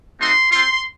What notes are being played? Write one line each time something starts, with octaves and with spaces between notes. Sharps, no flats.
A3 C4 D#4 F#4 C6
C4 F4 C6